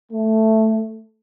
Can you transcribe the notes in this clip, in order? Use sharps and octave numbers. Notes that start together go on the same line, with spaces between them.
A3